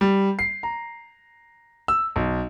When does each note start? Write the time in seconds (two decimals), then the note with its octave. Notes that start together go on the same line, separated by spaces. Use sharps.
0.01 G3
0.39 C7
0.63 A#5
1.88 E6
2.16 B1